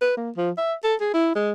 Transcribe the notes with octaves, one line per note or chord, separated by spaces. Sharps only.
B4
A#3
F3
E5
A4
G#4
E4
G#3